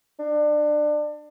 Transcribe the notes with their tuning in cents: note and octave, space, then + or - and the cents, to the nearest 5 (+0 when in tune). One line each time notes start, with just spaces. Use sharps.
D4 +25